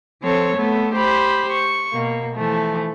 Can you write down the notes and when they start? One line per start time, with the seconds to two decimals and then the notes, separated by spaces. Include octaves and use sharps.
0.22 F3 C4 A4 C#5
0.57 A3 B3 A4
0.94 G4 C5 B5
1.52 C#6
1.93 B2 A#3
2.35 E3 F3 A3